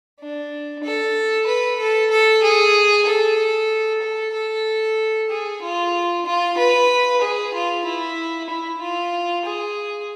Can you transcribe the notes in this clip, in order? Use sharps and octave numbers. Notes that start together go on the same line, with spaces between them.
D4
A4
B4
A4
A4
G#4
A4
A4
A4
G#4
F4
F4
B4
G#4
F4
E4
E4
F4
G#4